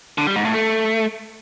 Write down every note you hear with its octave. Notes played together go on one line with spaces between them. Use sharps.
D3
G3
G#2
A2
A3